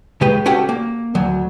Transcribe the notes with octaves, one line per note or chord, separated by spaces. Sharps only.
C#3 G#3 G4 B4
C#4 F#4 G4 A4 F#5 G5
A#3
D2 F#3